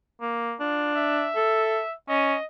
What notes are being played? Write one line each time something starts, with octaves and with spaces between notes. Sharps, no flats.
A#3
D4 F4
E5
A4
C#4 D#5